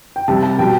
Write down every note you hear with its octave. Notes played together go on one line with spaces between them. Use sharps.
G5
C3 G3 A5
A5
B2 G3 G5